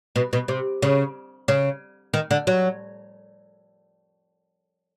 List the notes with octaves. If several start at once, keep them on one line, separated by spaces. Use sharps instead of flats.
B2
B2
C3
C#3
C#3
D#3
D3
F#3